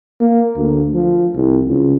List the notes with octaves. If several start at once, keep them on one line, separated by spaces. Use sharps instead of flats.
A#3
D2
F3
C2
C#2